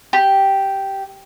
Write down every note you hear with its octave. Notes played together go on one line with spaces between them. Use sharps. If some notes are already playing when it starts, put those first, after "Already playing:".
G4